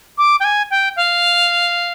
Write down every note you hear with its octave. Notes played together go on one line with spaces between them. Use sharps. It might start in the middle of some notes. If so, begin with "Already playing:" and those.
D6
G5
G#5
G5
F5